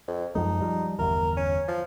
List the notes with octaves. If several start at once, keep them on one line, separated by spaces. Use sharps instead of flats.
F2
F#2 F3 G#3 D#4
F3 G3
G1 E2 A#4
C#4
F3